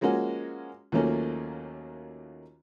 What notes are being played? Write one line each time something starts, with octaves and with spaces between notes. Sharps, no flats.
F3 G#3 A#3 C#4 F#4
D#2 F3 F#3 A3 A#3 C#4